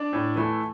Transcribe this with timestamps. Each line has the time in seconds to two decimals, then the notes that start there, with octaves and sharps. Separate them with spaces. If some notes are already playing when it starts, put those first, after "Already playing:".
Already playing: D4 D5
0.13 A2
0.36 E3 A3 E4